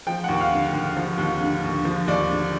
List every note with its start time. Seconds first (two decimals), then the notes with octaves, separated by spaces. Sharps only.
0.07 F3 G5
0.24 D#2 F#5
0.40 F5
0.51 D3
0.73 D#2
0.96 F3
1.18 D#2
1.41 D3
1.63 D#2
1.85 F3
2.07 D#2 D5
2.30 D3